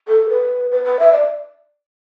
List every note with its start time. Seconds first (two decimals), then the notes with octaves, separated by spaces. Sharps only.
0.08 A4
0.29 B4
0.71 B4
0.84 B4
0.99 E5
1.12 D5